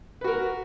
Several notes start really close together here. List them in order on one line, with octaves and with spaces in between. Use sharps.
B4 F#4 A#4